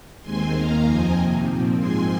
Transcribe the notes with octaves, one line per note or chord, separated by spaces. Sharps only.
D#2 D#3 G#3 C4 G#5 C6
D#2 D#3 A#3 F5 A#5
F2 F3 C4 D#5 G#5
C3 D#3 A#3
A#2 F3 C4
G#2 F3 G#3 C4 G#5 C6